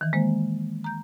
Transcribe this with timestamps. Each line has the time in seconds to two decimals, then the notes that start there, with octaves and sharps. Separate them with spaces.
0.01 D#3 E3
0.13 G#3 A#3 C5
0.84 A#5 G6